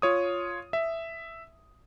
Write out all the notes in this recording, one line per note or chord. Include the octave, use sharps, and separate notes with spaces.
F4 C#5 D#6
E5